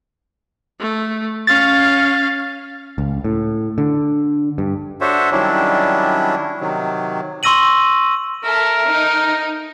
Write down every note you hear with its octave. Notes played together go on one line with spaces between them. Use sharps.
A3
C#4 F5 A6
C#2
A2
D3
G2
D4 F#4 A4 C5 C#5 E5
D#3 F#3 G3 C#4 D4 E4
C3 D#3 F#3
C6 C#6 E6 A#6 D#7 F#7
A4 A#4 E5
D#4